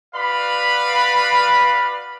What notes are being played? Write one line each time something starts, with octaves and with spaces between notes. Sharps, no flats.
F#4 B4 D5 F5 B5